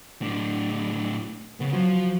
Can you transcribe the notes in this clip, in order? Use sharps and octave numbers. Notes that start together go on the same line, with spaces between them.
A2 D4
C#3 B3
F3 F#3